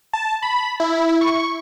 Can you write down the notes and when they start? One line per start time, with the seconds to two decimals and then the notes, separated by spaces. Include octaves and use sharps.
0.13 A5
0.42 B5
0.80 E4
1.21 C#6